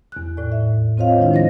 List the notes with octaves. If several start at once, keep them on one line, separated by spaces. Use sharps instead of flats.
E2 F#6
D#2 A2 D5
E5
C4 F4 C5 C#5 D#5 F5
D#3 G#3 D4 E4 F4
F3 G#3 C5 D#5 A#6